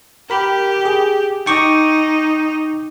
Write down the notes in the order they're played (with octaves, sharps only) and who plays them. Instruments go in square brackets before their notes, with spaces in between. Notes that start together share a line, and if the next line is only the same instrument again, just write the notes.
[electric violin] G4 [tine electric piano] A#4 B5
[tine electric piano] G#4
[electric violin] D#4 [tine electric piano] G5 C#6 D6